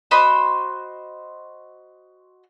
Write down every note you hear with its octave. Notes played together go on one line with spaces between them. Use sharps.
F#4 C5 D#5 B5